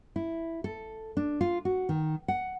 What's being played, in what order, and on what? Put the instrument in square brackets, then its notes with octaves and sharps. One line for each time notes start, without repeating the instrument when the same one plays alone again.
[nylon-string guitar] E4
A4
D4
F4
F#4
D#3
F#5